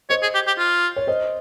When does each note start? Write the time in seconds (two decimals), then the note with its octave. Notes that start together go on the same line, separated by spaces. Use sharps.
0.10 C5 C#5 D#5
0.22 G#4
0.35 G4
0.47 G4
0.58 F4
0.96 C#5
1.07 C5 D#5